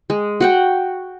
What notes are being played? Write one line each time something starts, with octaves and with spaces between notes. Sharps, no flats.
G#3
F#4 F#5 G5